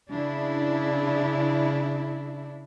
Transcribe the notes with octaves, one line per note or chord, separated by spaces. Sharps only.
C#3 D4 E4